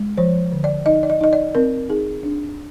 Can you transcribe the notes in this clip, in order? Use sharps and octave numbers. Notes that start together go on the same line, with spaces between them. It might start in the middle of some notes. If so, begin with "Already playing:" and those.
Already playing: G#3
F3 C5
D3
D5
D#4 D#5
D5
D#5
D#4 D#5
D5
C4 A#4
D#4 G#4
D4